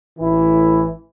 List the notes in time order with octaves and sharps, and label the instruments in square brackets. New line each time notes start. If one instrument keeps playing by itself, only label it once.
[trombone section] A1 A2 E3 E4